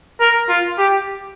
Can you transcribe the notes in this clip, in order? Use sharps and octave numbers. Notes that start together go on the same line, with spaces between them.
A#4
F4
G4